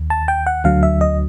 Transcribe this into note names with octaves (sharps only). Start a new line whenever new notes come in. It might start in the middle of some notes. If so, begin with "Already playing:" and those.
Already playing: D#2
A5
G5
F#5
D2 D3 F#3 F5
E5
D#5